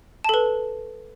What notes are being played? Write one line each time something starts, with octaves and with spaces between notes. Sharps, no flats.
A4 B4 A5